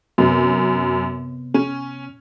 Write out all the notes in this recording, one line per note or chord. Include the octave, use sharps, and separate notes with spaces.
F#2 C3 B3
C#4